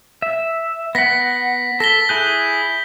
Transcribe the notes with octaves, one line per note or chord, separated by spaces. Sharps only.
E5
B3 F#5 A#6 B6
A4 A#6 B6 G7
E4 G#4 F#6 G6